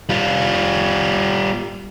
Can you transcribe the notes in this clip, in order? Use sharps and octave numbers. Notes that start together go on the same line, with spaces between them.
G3 F4